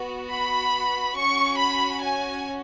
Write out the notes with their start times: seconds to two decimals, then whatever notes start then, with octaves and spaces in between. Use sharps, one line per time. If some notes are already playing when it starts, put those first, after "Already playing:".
Already playing: B3 F#4
0.31 B5
1.17 C#4 F#4 C#6
1.59 B5
2.02 G#5